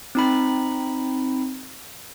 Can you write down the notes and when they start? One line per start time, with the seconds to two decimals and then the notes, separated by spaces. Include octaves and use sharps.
0.15 C4 D#4 B5